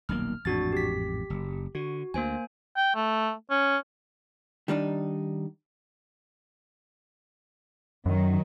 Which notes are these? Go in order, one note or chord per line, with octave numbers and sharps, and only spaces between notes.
D#1 B1 A#3 F6
A1 F2 G#2 D4 F#4 A6
G4 B6
F#1
D3 F#4
D2 A#3 C5 G#5
G5
A3
C#4
D#3 G3 D4 D#4
F#2 D#3 F#3